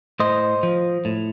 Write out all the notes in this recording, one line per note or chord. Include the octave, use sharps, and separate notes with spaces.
A2 C5 D#5
F3
A2